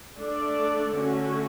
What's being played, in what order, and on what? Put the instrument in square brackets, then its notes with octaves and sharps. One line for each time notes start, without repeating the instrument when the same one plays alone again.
[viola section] A3 D4 A4 D5
D3 A3 C#4 F#4